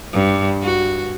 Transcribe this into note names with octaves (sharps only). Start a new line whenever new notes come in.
G2
F#4